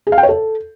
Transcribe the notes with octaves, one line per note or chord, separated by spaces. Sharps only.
G#4
F5
G5
C#5
A4